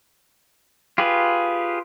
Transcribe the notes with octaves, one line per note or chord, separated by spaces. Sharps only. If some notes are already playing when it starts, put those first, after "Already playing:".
F4 G4 G#4 B4